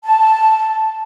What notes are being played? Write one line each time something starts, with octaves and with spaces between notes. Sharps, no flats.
A5